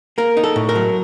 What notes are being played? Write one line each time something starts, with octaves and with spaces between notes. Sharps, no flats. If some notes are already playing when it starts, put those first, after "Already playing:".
A#3 A#4
D#4
A4
A2
A#4
F#3